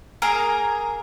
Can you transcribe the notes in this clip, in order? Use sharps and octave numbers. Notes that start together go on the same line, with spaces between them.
A#3 G#4 A#4